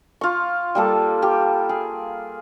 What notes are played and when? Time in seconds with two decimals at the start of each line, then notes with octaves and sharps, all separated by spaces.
0.21 F4 C#6
0.75 G3 A#3 A4
1.22 G4
1.69 G#4